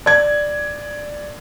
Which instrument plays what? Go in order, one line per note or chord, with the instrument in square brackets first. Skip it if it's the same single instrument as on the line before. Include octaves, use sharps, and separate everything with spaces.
[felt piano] D5 G#6